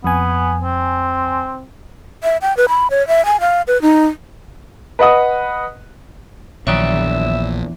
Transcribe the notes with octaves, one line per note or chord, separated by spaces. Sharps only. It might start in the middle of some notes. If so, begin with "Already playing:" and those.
F2 B3 G#5
C4
E5
G5
B4
B5
C#5
E5
G#5
F5
B4
D#4
B4 D#5 F#5 D#6
A#1 E2 D#3 F#3 C#5 D5 E5 G5